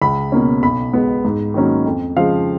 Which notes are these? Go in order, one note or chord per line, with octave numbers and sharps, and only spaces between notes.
C#2 B5
B2 A#3 C#4
B1 B5
B2 G#3 B3
G#2
D#3 F#3 A#3 C#4
F2
C#3 F3 G#3 F5